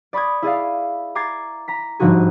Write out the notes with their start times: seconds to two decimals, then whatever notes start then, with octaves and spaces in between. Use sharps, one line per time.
0.13 D5 B5 C#6 D#6 G#6
0.42 E4 G#4 D5 F5
1.15 A#5 D6 G#6 A6 C7
1.68 A#5 B6
1.99 G1 G#2 D3 F3 F#4 G#4